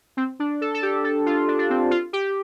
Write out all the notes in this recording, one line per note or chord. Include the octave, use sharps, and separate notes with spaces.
C4
D4
A4
A4
G4
A4
F4
D4
D4
C4
F4
G4